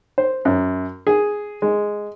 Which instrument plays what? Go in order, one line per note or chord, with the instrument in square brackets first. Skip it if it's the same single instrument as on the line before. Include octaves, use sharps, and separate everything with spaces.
[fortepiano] C5
F#2
G#4
G#3